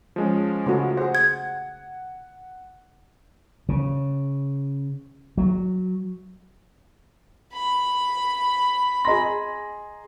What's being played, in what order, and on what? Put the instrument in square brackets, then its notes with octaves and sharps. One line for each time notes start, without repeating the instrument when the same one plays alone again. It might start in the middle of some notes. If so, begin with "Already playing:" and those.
[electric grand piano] F3 G#3 C#4
[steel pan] C#3 A3 F#4
[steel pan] G#4 C5 [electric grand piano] F#5
[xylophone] G#6
[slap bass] C#3
F#3
[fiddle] B5
[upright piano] G#4 A#5 A#6 [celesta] D#5 C6